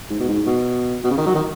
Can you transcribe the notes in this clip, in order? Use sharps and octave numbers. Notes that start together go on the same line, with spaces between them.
G#2
B2
G#2
B2
B2
C#3
D#3
F#3
D#3